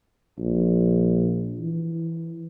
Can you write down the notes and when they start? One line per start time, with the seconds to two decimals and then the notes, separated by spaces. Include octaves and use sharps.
0.39 A#1
1.59 E3